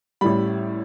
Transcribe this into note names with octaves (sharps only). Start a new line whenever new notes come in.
A1 A2 G3 B5